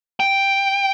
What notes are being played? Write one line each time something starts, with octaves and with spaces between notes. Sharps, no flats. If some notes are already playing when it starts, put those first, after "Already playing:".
G5